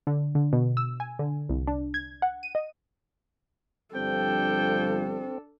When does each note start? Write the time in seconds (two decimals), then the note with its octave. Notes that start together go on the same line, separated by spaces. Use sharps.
0.07 D3
0.35 D3
0.53 B2
0.77 E6
1.00 G#5
1.19 D3
1.49 C2
1.67 D4
1.94 G#6
2.22 F#5
2.43 D#7
2.55 D#5
3.95 G1 F3 G3 C4 D4 A4 G5